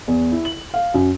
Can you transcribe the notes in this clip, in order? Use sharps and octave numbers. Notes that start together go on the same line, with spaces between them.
E2
E4
F#7
F5
F#2